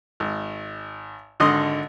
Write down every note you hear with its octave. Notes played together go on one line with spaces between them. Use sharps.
G#1
G#1 D3 D#5 C6 D#6